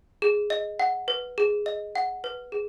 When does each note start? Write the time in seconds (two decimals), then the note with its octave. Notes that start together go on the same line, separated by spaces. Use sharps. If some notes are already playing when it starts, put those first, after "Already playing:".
0.22 G#4
0.50 D#5
0.79 F#5
1.08 B4
1.38 G#4
1.66 D#5
1.95 F#5
2.24 B4
2.52 G#4